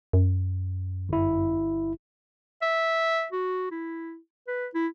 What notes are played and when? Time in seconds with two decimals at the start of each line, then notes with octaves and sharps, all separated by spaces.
0.13 F#2
1.09 G1 E4
2.62 E5
3.32 F#4
3.71 E4
4.48 B4
4.75 E4